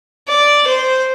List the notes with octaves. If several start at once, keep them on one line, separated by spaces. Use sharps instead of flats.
D5
C5